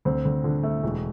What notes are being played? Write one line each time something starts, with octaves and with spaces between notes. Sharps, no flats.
D2 C4
D2
D3
A3
E1